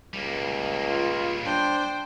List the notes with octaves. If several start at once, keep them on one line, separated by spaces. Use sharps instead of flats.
C#2 G3 A#3
F4
D4 C5 G5